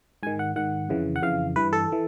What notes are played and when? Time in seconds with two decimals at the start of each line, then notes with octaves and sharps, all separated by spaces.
0.23 G#2 D#3 G#5
0.39 F#5
0.56 G#2 D#3 F#5
0.89 F2 C#3 E3
1.16 F#5
1.22 F2 C#3 E3 F5
1.56 G2 E3 B4
1.73 A4
1.92 E3